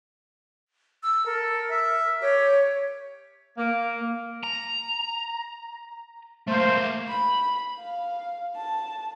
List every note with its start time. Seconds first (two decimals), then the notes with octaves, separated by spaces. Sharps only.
1.03 E6
1.26 A4 A#4
1.70 E5
2.22 G4 C#5
3.58 A#3
4.43 A#5
6.47 A3 A#3 C5
7.08 B5
7.79 F5
8.56 A5